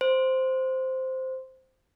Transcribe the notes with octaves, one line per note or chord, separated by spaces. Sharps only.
C5